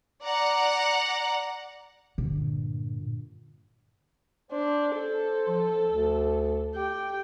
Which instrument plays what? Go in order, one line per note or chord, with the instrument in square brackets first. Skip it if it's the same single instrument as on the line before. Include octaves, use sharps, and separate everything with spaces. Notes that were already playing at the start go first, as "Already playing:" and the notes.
[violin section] D5 F#5 A#5
[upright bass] G2 D3 [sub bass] A#2
[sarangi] D4 [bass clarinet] C5
[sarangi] A4
[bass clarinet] F3
D2
[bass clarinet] G4 [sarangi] G5